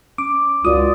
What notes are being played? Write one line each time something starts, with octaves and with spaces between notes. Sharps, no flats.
C#4 D6
C#2 F4 F#4 D5 D#6